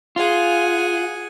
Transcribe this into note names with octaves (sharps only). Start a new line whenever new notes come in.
F4 G#4 F#5 G#5